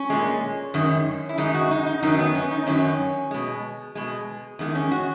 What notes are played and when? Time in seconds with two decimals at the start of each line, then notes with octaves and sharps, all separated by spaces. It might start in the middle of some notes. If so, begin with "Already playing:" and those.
Already playing: C#4
0.10 A#2 G#3
0.74 F#2 D#3 G#3
1.29 E4
1.38 F#2 D#3 G#3 D#4
1.55 F#4
1.71 D#4
1.86 D#4
2.03 F#2 D#3 F#3 D#4
2.19 B3
2.35 C#4
2.51 D#4
2.67 F#2 D#3 F#3 C#4
3.31 B2 G#3
3.95 B2 G#3
4.59 E2 D#3 G#3
4.75 C#4
4.92 F#4